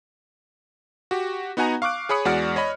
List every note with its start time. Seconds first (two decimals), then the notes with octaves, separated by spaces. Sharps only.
1.11 F#4 G4
1.57 B3 D#4 F#4 F#5 G#5 A#5
1.82 F5 C#6 D6 F#6 D7
2.09 G#4 C#5 B5 D#6 C#7
2.25 E2 G#3 F#4 D5 F#5 F6
2.56 C#5 D#5 B5